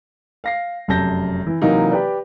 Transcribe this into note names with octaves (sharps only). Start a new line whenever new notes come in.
F5 A#6 C7
F1 F#2 C3 A5 G6 A#6
E3
C3 E3 F#3 A#3 D#4
G4 B4 D5